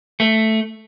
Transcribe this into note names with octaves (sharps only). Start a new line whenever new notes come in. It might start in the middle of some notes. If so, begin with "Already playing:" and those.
A3